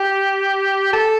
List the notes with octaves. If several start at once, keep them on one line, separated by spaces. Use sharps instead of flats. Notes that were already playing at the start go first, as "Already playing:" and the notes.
Already playing: G4
A4